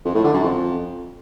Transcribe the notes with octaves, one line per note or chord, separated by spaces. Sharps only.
F2
A2
D3
F#2
F2